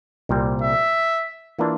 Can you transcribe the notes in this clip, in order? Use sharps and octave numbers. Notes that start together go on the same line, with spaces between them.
C2 A#2 G3 C4
E5
E3 A#3 D4 F4